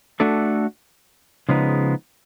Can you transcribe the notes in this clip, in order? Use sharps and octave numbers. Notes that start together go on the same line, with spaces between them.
A3 D4 F#4 A4
C#3 F3 G#3 B3 D#4